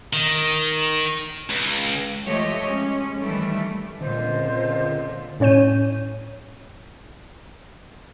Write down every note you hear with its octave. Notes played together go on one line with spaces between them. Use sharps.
D#3
C#2
F3 G#3 A3 G4 C#5 D#5
G#3 C#4
D#3 E3 G3 A3
C#2 A#2 D3 C4 F4 C5 D#5
A2 C#4 C#5 G6 D#7